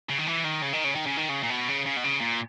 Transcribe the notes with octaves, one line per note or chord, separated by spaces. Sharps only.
C#3
D#3
E3
D#3
C#3
D#3
C#3
D#3
C#3
D#3
C#3
A#2
B2
C#3
C#3
B2
C#3
A#2